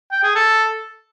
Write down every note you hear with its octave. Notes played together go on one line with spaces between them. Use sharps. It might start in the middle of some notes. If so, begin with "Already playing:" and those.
G5
G#4
A4